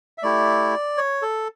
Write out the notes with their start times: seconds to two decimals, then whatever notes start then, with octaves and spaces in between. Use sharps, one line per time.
0.18 E5
0.23 A3 E4 G4 D5
0.98 C#5
1.22 A4